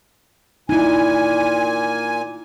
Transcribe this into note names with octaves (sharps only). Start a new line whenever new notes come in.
A#2 D#4 E4 G#5